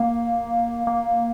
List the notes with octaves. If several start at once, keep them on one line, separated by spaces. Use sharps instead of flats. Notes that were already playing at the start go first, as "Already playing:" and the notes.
Already playing: A#3
A#3